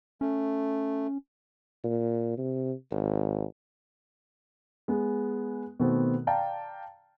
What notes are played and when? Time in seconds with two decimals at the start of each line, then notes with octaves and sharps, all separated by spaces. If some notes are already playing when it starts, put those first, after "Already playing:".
0.21 A3 C#4
1.84 A#2
2.37 C3
2.91 G#1
4.88 G#3 B3
5.80 B2 D#3 A3 B3 C4
6.27 D5 F5 G5 A5 A#5